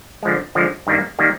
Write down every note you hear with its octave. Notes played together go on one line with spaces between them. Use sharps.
D3 F3 G#3
D3 F3 G#3
G2 D#3 G3 A#3
D#3 G3 A#3